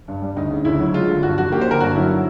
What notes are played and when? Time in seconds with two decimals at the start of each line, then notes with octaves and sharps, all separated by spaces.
0.08 G2
0.22 G3
0.36 D2 D#4
0.51 C#3
0.65 D2 E4
0.79 F#3
0.94 G#3 F4
1.09 D3
1.23 G2 F#4
1.38 F3 F#4
1.51 A#3 G4
1.61 C5
1.67 D3 A#4
1.80 G2 F#4
1.96 F#3 E4